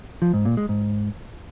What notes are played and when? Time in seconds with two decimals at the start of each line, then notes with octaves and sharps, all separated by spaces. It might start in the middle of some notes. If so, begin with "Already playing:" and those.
0.22 F3
0.34 G#2
0.45 A#2
0.57 G#3
0.69 G#2